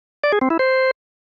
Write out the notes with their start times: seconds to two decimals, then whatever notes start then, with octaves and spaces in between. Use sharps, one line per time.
0.24 D5
0.32 G#4
0.41 C4
0.50 E4
0.59 C5